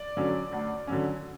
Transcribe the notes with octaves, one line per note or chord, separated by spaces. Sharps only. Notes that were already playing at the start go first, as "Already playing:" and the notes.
Already playing: D5
D3 F#3 C#4
D2
D3 F#3 C#4